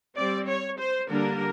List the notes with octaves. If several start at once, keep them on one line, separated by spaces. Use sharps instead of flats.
G3 C4 D5
C#5
C5
D3 G3 A#3 D4 A#4